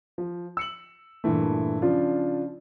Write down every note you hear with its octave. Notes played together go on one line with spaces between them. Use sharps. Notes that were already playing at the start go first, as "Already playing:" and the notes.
F3
E6 C#7 F#7
G2 A#2 E3 A3
C#3 F3 D4 F4